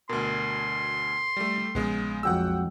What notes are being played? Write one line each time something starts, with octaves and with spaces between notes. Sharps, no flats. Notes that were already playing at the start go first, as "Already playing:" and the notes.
D2 B2 A#4 C6
G3 A3
A#1 C#3 G#3 B3
F2 F#3 G#3 F#5 G5 E6